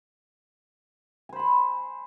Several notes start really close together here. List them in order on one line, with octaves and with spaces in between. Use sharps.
G#5 C5 B5 C6